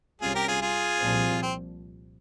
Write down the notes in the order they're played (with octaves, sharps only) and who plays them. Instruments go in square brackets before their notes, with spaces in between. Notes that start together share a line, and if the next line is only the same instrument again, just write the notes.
[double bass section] C2 C3 G3 C#4 [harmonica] F4 G#4
[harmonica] G4 A#4
F4 G#4
F4 G#4
[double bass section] C2 A#2 F3 C4
[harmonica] C4